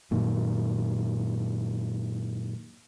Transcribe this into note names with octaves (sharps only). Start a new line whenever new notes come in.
F#2 A#2 D#3